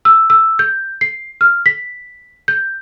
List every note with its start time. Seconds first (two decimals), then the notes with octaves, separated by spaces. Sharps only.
0.05 E6
0.30 E6
0.59 G6
1.01 C7
1.41 F6
1.66 B6
2.48 G6